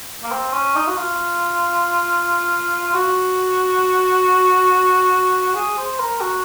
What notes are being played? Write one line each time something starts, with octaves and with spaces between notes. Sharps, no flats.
A#3
C4
C#4
D#4
F#4
F4
F#4
G#4
C5
A#4
F#4